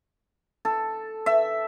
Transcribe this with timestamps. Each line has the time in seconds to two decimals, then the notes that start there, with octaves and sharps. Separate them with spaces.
0.65 A4
1.26 E5